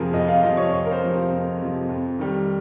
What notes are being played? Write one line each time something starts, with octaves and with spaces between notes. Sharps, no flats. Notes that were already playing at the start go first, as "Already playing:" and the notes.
Already playing: F2 C3 F3 G#4 A#4
F2 D#5
F5
C3 F3 D#5
C#5
F2 C#5
A#4
C5
C3 F3
C5
F2
C3 F3
F2
D#3 G3